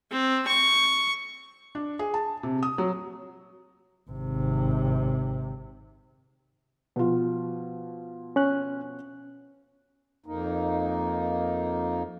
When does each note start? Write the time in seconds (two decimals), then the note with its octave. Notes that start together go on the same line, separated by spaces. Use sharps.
0.11 C4
0.47 C#6
1.75 D4
1.99 G#4
2.14 A5
2.43 C3
2.63 D#6
2.78 F#3
4.11 G#1 C3
6.96 B2 F3 F4
8.36 C#4 F#6
10.26 F2 A#3 D#4